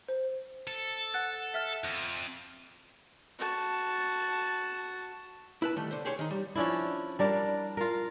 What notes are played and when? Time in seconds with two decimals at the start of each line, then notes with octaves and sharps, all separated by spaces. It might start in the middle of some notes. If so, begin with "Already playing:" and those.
0.08 C5
0.67 A4
1.14 F#5 F#6 A6
1.54 E5 F6 A6
1.84 F2
3.38 F#4 A5
5.62 E4 B4 A5
5.76 D3 D#3 G3 A3
5.91 D3 C5
6.05 G4 G#4 C5 C#5
6.19 D#3 D#4
6.31 G3
6.55 F3 C#4 D4 E4
7.19 G3 D4 A#4
7.77 F4 A#4